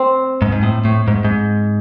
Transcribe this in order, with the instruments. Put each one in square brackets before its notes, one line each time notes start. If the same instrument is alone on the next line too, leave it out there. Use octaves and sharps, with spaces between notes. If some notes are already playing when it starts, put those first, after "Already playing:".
Already playing: [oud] C4
[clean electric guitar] G#2
G#2
A2
A2
G#2
G#2